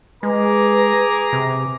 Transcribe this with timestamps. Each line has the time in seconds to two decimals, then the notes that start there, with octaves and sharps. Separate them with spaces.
0.23 G#3 G#4 B4 A#5 D6
1.33 C3